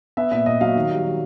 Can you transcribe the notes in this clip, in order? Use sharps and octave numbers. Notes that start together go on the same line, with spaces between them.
B3 E5
A#2 E5
A#2 D#5
F#3 F5
D#3
G3
G3